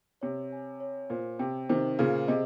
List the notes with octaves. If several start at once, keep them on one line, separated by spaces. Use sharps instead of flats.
C3 C#5
G#5
C#5
A#2 C5
C3 G5
C3 D#3 C5
A#2 C#3 G#4
C3 D#5